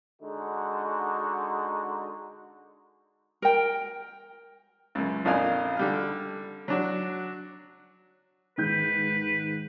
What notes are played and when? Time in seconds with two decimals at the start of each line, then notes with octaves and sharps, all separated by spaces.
0.22 D3 G#3 D#4 F#4
3.42 A#4 G5
4.95 C#2 F#2
5.25 A#1 F2 D#4 D5 F5 G#5
5.77 D3 G3 F6
6.68 F#3 D4 F#4
8.58 G#2 D#3 B4 G6